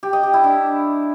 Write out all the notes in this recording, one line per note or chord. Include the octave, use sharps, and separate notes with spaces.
G4
D#5
G4
E4
D4